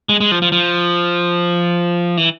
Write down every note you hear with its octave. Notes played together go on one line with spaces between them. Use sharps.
G#3
G#3
F3
F3
F3
E3